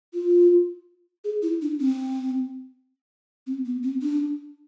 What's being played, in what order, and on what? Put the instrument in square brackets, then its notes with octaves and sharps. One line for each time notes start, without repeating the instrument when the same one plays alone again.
[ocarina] F4
G#4
E4
D4
C4
C4
B3
C4
D4